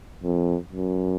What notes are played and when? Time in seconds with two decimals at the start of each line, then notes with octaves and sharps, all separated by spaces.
0.23 F2
0.72 F#2